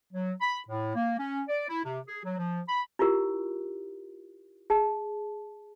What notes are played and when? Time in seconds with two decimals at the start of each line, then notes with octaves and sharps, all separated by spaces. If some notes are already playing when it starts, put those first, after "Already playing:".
0.12 F#3
0.41 B5
0.69 A2
0.95 A#3
1.18 C#4
1.49 D5
1.69 E4
1.85 C3
2.08 G#4
2.25 F#3
2.38 F3
2.69 B5
2.99 E4 F4 G4 A#4
4.70 G#4 A5